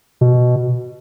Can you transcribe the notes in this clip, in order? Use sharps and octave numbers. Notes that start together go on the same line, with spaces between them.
B2